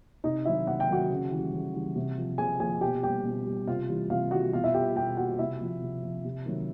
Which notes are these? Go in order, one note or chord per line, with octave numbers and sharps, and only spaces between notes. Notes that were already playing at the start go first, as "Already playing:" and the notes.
C3 D#4 D#5
D#3 F#3 E4 E5
C3 F#5
G5
D#3 F#3 F#4 F#5
C#3
E3 G3
C#3
E3 G3
C3
F3
C3 G#4 G#5
F3 G#4 G#5
B2 G4 G5
G3 G4 G5
B2
G3
C3 F4 F5
E3 G3
C3 F4 F5
E3 G3 F#4 F#5
B2 F4 F5
E4 E5
G3 G4 G5
B2 G4 G5
G3 F#4 F#5
C3 E4 E5
F3
C3
F3
C3
D#3 F#3